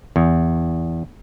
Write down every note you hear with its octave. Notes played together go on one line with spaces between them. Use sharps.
E2